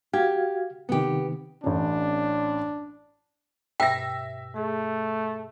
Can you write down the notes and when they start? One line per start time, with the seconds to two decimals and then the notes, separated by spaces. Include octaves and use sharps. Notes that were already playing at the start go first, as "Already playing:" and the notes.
0.13 F#4 G4 F5 G#6
0.89 C3 D#3 B3 G4
1.64 A1 C#4 D4
3.80 G2 B2 E5 G5 A#6
4.56 A3 G#4